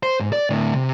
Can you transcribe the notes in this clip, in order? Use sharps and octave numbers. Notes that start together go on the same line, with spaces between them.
C5
G#2
D5
D2 A2
C3